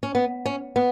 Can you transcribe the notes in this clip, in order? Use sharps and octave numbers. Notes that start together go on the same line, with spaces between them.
C#4
B3
C#4
B3